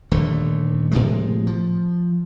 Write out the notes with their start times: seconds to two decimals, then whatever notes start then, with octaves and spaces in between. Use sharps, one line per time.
0.12 D#1 D3 A3
0.91 A2 C3 F3 G#3
1.47 F3